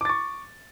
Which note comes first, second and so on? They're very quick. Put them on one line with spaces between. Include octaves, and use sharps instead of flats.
D6 A6 C#6